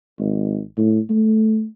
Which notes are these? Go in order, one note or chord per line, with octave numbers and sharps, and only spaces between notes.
G#1
A2
A3